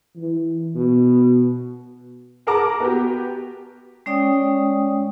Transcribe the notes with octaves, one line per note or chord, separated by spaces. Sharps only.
E3
B2
G#4 A#4 F#5 A5 A#5 D6
B3 F#4 G4
G#3 C#4 C#5 D5 G5 D#6